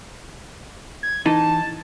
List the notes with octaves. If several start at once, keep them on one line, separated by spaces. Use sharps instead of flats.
G#6
E3 D#4 D#5 A5